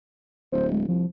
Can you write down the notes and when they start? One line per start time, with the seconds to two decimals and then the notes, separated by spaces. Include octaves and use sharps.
0.52 D1 C5
0.71 G#3
0.88 C2 F3